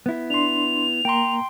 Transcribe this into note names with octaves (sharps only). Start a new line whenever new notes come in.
B3 E4
D4 C6 F7
A#3 G5 A#5 C6